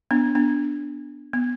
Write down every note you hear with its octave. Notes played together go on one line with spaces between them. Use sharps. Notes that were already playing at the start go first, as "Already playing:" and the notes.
B3 D4
B3 D4
B3